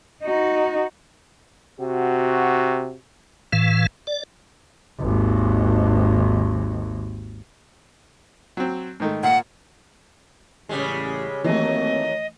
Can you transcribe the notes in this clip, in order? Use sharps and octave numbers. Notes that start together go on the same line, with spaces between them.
D#4 F#4
C3 F#4
A2 E3 F5
D5
G#1 D#2
F#3 C4
G#2 D#3 A3
A#2 F5 F#5
A1 C#3 G3 G#3
D#2 E3 F#3 A3 A#3 C4 D#5